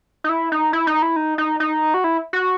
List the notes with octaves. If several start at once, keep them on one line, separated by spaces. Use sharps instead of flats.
D#4
E4
D#4
E4
D#4
E4
D#4
D#4
D#4
F#4
E4
F#4